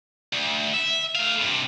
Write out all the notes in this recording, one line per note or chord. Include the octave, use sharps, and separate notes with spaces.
D2
E5
A3 F5
G2 C3